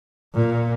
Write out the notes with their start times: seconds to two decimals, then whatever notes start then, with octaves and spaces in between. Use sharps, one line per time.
0.35 A#2